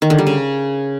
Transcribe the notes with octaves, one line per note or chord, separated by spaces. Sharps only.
D#3
D3
G3
C#3